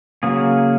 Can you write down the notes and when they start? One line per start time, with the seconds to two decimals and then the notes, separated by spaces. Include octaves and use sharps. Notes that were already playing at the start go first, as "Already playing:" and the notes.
0.23 C#3 F#3 A#3 G#4